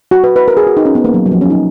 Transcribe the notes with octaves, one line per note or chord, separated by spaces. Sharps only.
F#4
B4
B4
A#4
G#4
F#4
D#4
C#4
B3
A#3
F#3
F#3
F3
C#4
D#4